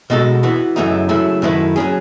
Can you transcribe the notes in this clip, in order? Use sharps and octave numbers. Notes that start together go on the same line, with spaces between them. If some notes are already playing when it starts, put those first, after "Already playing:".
B2 G#3 D#4 F#4 A4
E3 B3 F#4
F#2 C#3 E3 A3 D#4
C#3 F#3 A3 E4
F#2 D#3 A3 E4 B4
F#3 C#4 G#4